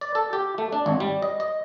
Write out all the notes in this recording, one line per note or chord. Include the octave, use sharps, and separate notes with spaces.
D5
A4
G4
A3
D4
G#1
G3
D#5
D#5